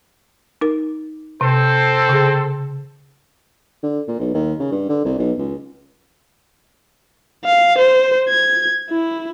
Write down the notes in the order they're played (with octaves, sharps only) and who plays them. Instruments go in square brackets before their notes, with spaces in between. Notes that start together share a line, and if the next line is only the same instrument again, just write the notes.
[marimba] D#4 A#4
[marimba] C3 [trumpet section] C4 A4 C5
[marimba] C#3 G#4
[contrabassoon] D3
A#2
B1
D#2
C#3
G2
D3
C2
B1
C#2
[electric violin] F5
C5
G#6
E4